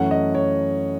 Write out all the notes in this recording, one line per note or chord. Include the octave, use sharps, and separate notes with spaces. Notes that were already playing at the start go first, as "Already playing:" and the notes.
Already playing: F#2 E3 A3 C#4 F#5
D#5
C#5